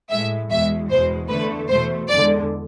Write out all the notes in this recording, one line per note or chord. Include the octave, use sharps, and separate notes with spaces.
A2 G#3 E5
E2 B2 G#3 E5
E2 B2 G#3 C5
E2 D3 A3 B4
E2 B2 A3 C5
E2 D3 G#3 D5